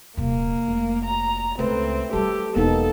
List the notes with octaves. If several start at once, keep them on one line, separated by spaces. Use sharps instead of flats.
D#1 C3 A#3
F1
A#5
C#2 A3 C4 B4
F#3 G3 G4 A4
E1 A#3 B3 D#4 A4